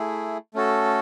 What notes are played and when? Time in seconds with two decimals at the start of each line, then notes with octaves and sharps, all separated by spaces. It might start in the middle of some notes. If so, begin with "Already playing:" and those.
Already playing: A3 E4 G#4
0.54 A3 C#4 F#4 A4